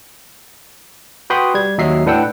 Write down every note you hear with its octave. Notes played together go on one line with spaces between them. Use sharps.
F#4 B4 G5 B5 C6 D#6
G3 G#6
D#2 F#3 D#5 E5 C7
A2 D4 B4 F#5 G5 E6